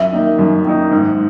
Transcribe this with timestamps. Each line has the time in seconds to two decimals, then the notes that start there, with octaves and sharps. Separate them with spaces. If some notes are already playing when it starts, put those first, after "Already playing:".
Already playing: F#2 E5
0.12 D#3 A#3 D#4
0.39 F#2
0.65 D#3 A#3 D#4
0.91 G#2